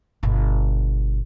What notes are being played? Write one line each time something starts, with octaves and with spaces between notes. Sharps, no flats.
G1 B2